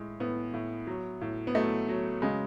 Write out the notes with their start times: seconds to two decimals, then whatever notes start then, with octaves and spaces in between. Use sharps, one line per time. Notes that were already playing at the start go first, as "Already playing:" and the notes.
Already playing: A2 G#3
0.20 A2 B3
0.54 A2
0.87 F#3
1.21 A2
1.47 B3
1.55 F#3 A3
1.88 F#3
2.22 C#3 G#3